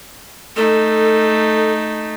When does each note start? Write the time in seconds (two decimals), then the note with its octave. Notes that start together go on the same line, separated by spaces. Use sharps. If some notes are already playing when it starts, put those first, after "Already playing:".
0.56 A3 D#4 A4